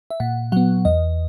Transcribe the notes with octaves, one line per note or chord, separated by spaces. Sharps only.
E5
A#2 F#5
F#3 B3 F#5
E2 D#5